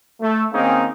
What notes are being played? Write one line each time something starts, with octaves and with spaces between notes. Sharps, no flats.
A3
D#3 A#3 C4 C#4 D#4 G#4